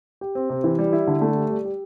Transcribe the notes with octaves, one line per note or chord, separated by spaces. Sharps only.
G4
C4
C3
E3
G3
E4
D3
A3
G4
G3
G4